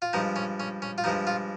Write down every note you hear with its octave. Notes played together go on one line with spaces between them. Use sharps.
F4
G2 F3 G#3 D#4
C#4
C#4
C#4
F4
G2 F3 G#3 D#4
F4